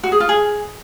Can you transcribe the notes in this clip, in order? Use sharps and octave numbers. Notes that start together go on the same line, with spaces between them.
F#4
G#4
F4
G#4